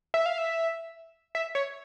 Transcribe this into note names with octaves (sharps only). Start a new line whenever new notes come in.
E5
F5
E5
E5
C#5